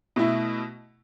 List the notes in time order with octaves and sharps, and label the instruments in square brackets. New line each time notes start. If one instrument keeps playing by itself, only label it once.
[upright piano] B2 A3 E4